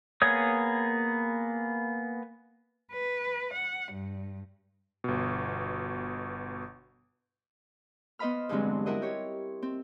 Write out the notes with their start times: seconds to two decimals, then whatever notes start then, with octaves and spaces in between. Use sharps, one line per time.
0.22 A#3 B3 G#4 C#5 D#6
2.91 B4
3.53 F#5
3.92 G2
5.04 G1 B2
8.19 B3 C5 D#5 F5 B5 F6
8.49 E2 G2 D3 F#3 G#3 C4
8.86 E4 F#4 A#4 C5 D#5
9.02 G4 C#5
9.62 C4